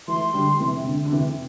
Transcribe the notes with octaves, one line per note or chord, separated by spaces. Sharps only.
E3 A3 C6
D3 G3
C3 E3
C3
D3
D3
C3 E3